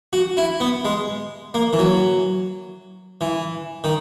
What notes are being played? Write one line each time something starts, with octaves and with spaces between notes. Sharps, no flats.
F#4
E4
B3
G#3
A#3
E3
F#3
E3
D#3